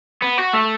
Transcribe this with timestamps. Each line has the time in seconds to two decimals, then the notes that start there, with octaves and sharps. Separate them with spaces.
0.22 B3
0.38 F#4
0.53 A3